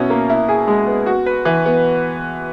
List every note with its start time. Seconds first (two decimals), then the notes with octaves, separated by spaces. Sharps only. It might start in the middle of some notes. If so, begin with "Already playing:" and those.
Already playing: B2 C#4 E4
0.10 A#3
0.30 E4
0.49 G#4
0.67 G#3
0.87 B3
1.06 F#4
1.26 B4
1.45 E3
1.66 B3